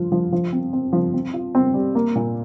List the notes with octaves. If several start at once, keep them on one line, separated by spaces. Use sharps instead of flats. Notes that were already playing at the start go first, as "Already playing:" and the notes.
Already playing: F3 F4
F3
F3
C4
C4
F3
C4
F4
C4
G3
A#3
A#2